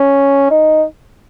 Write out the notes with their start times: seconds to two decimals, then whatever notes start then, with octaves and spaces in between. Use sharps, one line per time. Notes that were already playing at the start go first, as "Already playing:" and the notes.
Already playing: C#4
0.51 D#4